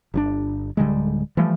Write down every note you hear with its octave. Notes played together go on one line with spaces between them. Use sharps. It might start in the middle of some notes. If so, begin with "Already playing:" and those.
G1 D3 D4
D1 D3 G3 G#3
E3 F3 G3 A3